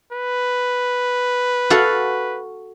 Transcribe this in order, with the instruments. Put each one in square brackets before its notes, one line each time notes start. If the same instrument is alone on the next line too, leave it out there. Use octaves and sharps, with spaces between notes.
[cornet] B4
[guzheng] F#4 A4 F5